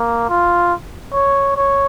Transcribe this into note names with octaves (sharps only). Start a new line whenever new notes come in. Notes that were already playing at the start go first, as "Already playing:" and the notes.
Already playing: A#3
F4
C#5
C#5